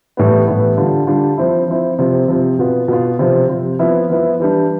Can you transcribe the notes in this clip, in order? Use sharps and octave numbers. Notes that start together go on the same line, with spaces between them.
A2 E3 G3 B3
A2 E3 G3 B3
D3 G3 D4 F4
D3 G3 D4 F4
F3 C4 E4
F3 C4 E4
C3 F3 C4
C3 F3 C4
B2 B3 F4
B2 B3 F4
C3 F3 C4
C3 F3 C4
F3 B3 E4
F3 B3 E4
E3 G3 D4